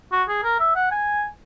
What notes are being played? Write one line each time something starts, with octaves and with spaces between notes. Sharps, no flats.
F#4
G#4
A#4
E5
F#5
G#5